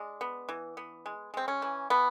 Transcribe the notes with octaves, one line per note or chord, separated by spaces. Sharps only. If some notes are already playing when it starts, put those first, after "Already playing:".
Already playing: G#3 D4
B3
E3
B3
G#3
G#3 C4
C#4
E3
E3 B3